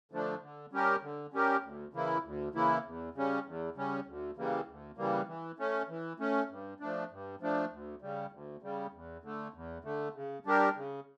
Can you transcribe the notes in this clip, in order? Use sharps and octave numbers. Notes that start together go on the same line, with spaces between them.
D3 F3 A3 D4
D3
G3 C#4 G4 A#4
D3
G3 C#4 G4 A#4
D2
C#3 E3 A#3 E4
D2
C#3 E3 A#3 E4
E2
C#3 G3 C#4
E2
C#3 G3 C#4
D2
C#3 E3 G3 A#3
D2
C#3 E3 G3 A#3
E3
A3 C#4
E3
A3 C#4
G2
F3 A3 D4
G2
F3 A3 D4
D2
C#3 G3
D2
C#3 G3
E2
D3 A3
E2
D3 A3
C#3
G3 D4 G4 A#4
C#3